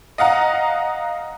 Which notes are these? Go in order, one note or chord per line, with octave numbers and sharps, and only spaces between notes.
D#5 F5 F#5 A#5